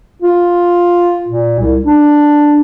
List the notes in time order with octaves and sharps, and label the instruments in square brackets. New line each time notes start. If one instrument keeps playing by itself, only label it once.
[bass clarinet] F4
A#2
C2
D4